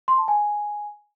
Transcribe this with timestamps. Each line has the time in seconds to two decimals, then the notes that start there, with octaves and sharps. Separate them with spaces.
0.08 C6
0.18 A5
0.28 G#5